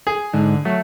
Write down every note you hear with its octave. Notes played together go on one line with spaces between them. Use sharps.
G#4
G#2 D3
F#3 A3